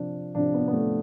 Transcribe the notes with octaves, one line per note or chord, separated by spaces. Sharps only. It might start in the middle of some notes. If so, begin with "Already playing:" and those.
Already playing: C3 F3 D4
C3 F3 D4
B3
B3
A3